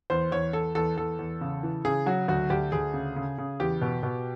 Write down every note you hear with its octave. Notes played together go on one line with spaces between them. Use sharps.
E2 C5
E2 C#5
E2 A4
E2 A4
E2 A4
E2
C#3
E3
C#3 G#4
F#3 F#4
D2 F#4
D2 G4
D2 G#4
C#3
C#3
C#3
E2 G4
B2
B2